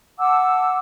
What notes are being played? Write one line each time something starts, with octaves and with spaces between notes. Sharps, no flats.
F#5 A5 D6 E6